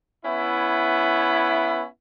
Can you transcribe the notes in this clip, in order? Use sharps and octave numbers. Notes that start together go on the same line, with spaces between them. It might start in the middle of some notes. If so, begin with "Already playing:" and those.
B3 C#4 E4